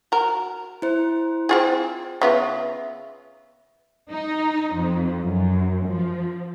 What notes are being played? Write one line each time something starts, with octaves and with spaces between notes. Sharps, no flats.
F#4 A#4
E4 C5
C4 F4 G#4
C#3 B3 F4 E5
D#4
F2
F#2
F3